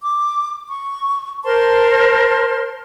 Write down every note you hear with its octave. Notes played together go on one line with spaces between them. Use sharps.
D6
C#6
A#4 C5 A5 C6